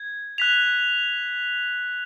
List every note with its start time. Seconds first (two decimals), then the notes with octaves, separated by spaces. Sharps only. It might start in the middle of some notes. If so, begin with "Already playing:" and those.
Already playing: G#6
0.38 F#6 B6 F7